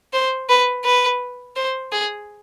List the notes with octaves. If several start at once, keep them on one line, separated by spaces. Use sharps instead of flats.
C5
B4
B4
C5
G#4